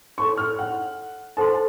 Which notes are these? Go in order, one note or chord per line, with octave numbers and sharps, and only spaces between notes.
A4 C#5 A5 C6 C#6
F6
F#5
A4 C5 F#5 A5 C6